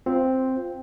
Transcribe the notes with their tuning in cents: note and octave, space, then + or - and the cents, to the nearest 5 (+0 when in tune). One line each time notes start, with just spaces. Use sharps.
C4 +0 F4 +0